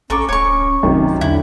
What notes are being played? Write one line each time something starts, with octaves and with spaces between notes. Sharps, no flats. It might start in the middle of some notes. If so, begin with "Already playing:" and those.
A1 C#4 A4 A#5 C#6 D6
D1 C#5 C#6
B1 F#2 C3 D#3
E2 D3 E4